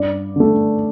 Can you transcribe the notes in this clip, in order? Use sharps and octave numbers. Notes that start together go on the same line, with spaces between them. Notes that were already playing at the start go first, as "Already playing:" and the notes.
Already playing: G2 D5
D3 A3